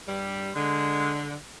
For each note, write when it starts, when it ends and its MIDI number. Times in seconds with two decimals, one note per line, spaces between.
0.08 0.50 43
0.08 0.50 55
0.55 1.35 50
0.55 1.20 56